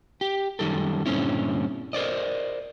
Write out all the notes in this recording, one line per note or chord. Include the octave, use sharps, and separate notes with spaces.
G4
F#2 C3 D#3 G3 A4
G2 A#2 D3 C4 C#4 E4
A#4 C5 D5 D#5